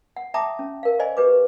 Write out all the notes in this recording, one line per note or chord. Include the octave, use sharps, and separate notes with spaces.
F#5
E5 G5 A5 A#5 D6 D#6
C#4
A#4 F5
G#4 C5 D5 D#5 G#5
G4 B4 D6